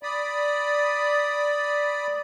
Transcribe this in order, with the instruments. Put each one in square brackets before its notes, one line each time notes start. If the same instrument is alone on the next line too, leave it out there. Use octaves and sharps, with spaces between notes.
[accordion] D5 B5 D#6